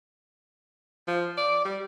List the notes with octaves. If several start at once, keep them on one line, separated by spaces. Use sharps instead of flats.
F3
D5
G3